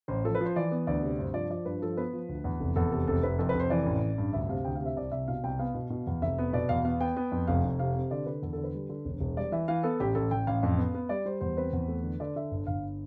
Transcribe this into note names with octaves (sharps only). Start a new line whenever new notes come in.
A1 C5
F3 A4
B4
F3 C5
E3 D5
B3
D2 D5
C3
G2 C5
F3 D5
F3 D5
G2 B4
F3 A4
B3 B4
F3
D2
E2
F1
E2 A4
C3 A4
F1 A4
F1 B4
F2 A4
B4
F1 C5
E3 D5
A1
A1
G2
D2 E5
C3 F5
D2 G5
C3 F5
E5
C2 D5
C2 E5
B2 F5
C2 G5
B3 F5
B2
B2
E2
F1 E5
B3
B2 D5
E2 F5
B3 F5
B3 G5
B3
F2
F1 F5
F1
C3 F5
C3
D3 D5
D3 B4
E2 A4
D3 A4
B4
G3
D3
E1
E1
G3 D5
E3 E5
E3 F5
B3 A4
A1 G4
A1 A4
A1 G5
A1 F5
F2
B3
B3
G3 D5
G3 C5
E2 C5
C4 B4
E2
A3
D3
D3 D5
D3 E5
G1
G1 F5